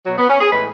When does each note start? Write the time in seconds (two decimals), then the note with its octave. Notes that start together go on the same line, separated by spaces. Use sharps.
0.05 B2 F#3
0.17 B3
0.28 C#4
0.40 G#4
0.51 A2 E3 G#3 B4